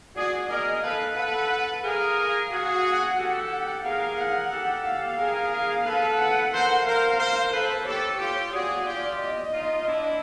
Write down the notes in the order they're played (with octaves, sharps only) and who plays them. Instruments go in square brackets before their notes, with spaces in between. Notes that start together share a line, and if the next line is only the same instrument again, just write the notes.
[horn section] F#4 G#4 [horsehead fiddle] D5
[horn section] G#4 A#4 [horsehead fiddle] D#5
[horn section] A4 B4 [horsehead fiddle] F5
[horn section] A4 B4 [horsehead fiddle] F#5
[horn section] G#4 A#4 [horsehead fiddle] F5
[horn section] F#4 G#4 [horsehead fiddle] F5
[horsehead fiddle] F#5
[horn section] G4 A4
[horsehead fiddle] F#5
[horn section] G#4 A#4 [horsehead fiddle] F5
[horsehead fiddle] F#5
[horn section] G4 A4
[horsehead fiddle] F5
[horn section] G#4 A#4
[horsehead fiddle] F5
[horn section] A4 B4
[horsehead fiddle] F#5
[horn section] A#4 C5 [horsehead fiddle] F#5
[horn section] A#4 C5 [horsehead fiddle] F5
[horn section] A#4 C5
[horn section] A4 B4 [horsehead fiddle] C5
[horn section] G4 A4 [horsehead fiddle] C#5
[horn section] F4 G4
[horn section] F#4 G#4 [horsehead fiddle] D5
[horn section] F4 G4
[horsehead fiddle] D#5
[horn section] D#4 F4
D4 E4